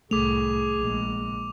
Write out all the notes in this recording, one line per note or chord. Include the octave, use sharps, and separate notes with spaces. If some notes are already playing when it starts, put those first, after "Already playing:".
C2 A2 A3 G#4 D6 F7
A#1 G#3